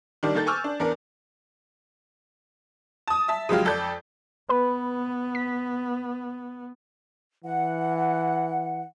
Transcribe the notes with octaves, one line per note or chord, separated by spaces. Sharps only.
D#3 G3 D4
D#3 A#3 A4 G6 A6
G#5 C#6 D6 E6 F6
D4
E2 D4 A#4
A5 D#6
E5 A5
C#3 F3 F#3 G#3 G4 F5
F2 A4 D5 G6
B3 B4 B5
B6
E3 F#5